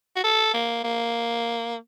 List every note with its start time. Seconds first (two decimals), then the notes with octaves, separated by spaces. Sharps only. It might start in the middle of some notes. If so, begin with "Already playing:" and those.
0.16 F#4
0.24 A4
0.54 A#3
0.84 A#3